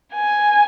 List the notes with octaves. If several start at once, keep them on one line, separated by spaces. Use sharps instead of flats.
G#5